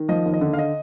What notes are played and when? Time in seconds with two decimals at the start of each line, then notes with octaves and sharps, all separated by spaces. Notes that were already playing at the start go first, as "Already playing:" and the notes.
Already playing: D#3
0.09 F3 D#5
0.25 D#2
0.34 D#5
0.41 D3
0.53 F5
0.59 D#5